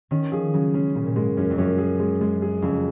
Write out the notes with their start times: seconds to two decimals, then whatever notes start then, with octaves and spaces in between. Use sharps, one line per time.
0.11 D#3 C#4
0.32 F3 G#4
0.54 C#3 F#3
0.74 G#3 C#4
0.95 A#2 C#3
1.06 A#2
1.16 G#2 G#3
1.37 F#2 C#4
1.50 F2
1.57 F#2 C#4
1.78 G#4
2.00 G#3
2.21 G#3
2.42 G#4
2.62 F2 C#3